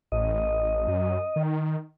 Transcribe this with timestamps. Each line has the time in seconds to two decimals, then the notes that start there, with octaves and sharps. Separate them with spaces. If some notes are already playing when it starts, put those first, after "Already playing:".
0.12 A1 D#5
0.88 F#2
1.36 D#3